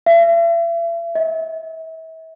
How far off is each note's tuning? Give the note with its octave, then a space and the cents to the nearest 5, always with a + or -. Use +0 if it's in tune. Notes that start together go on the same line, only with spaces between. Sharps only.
E5 +40
E5 -35